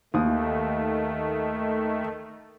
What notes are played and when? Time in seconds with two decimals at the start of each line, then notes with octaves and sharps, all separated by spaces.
0.14 D#2 D#3 A3 D#6